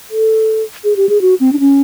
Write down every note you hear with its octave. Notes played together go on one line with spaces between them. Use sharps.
A4
G#4
G4
G#4
F#4
C4
D4
C#4